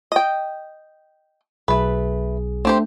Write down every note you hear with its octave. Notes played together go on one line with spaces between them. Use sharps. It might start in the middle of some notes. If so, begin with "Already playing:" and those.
D#5 G5
B1 A3 G#4 B4
A3 C4 D4 G4 C5